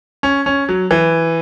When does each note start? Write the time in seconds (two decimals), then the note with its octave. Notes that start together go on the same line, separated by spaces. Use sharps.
0.23 C#4
0.46 C#4
0.69 F#3
0.91 E3